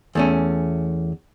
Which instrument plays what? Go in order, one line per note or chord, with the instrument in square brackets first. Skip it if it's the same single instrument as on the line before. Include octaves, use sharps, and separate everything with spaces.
[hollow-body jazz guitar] E2 A3 C#4